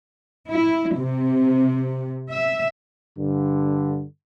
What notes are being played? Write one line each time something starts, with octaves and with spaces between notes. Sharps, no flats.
E4
C3
E5
G2 D3